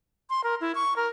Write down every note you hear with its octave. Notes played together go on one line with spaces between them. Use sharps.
C6
A#4
E4
C#6
A#4